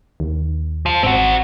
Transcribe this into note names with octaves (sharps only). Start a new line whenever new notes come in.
D#2
F3
G#1 C4 F#4